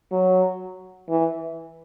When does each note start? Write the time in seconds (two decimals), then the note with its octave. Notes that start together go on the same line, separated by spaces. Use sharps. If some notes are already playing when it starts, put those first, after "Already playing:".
0.11 F#3
1.10 E3